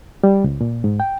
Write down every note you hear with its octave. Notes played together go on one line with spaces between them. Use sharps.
G3
C#2
A#2
G#2
G5